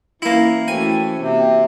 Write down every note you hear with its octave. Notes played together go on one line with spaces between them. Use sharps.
E3 A#3 C#4 E4
E3 A3 C#4 F#4 C5 G5 G#5
C3 A#3